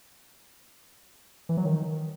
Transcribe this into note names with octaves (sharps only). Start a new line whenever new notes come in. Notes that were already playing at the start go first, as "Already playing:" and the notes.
E3
F#3
D#3